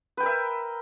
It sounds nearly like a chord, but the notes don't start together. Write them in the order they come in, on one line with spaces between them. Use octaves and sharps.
B4 G5 A#4 E5